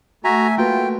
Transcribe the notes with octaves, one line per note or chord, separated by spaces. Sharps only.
A3 F#4 E5 G#5 A#5
A#3 F4 F#4 B4 G5